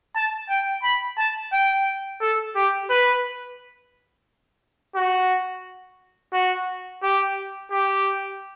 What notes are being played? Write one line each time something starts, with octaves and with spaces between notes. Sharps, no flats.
A5
G5
B5
A5
G5
A4
G4
B4
F#4
F#4
G4
G4